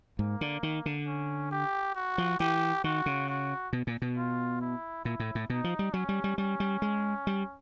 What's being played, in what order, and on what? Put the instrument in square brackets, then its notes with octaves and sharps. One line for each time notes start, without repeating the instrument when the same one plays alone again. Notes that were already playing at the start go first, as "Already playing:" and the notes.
[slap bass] G#2 [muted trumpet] A#3
[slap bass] D3
D#3
D3
[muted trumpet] C#4
G4
F#4
[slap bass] F3
[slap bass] E3 [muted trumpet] G4
[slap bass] D#3 [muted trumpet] F#4
[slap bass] C#3
[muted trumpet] F#4
[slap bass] B2
A#2
B2
[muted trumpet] F4
E4
[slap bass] A#2 [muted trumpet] E4
[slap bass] A2
A2
[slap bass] B2 [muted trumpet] D#4
[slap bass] F3
G3
[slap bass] F#3 [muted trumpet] C#4
[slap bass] G3
G3
[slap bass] G3 [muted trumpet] C#4
[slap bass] G3
G#3
G3